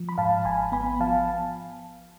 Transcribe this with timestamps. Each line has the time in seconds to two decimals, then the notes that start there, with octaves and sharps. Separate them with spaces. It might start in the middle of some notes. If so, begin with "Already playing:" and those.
Already playing: F3
0.09 B5
0.18 G#2 F5 A5
0.45 G#1 G#5 B5
0.72 B3 G#5 B5
1.00 F3 F5 A5